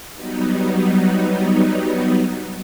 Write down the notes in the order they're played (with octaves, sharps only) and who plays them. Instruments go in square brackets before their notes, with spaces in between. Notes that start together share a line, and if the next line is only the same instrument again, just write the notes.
[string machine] F#3 G3 B3 D#4